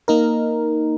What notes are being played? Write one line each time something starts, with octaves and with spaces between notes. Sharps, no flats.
A#3 D#4 A#4